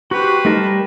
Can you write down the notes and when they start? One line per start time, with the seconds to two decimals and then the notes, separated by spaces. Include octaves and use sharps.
0.11 F#4 G4 B4 C5
0.45 G3 A3 D#4 A#4 A5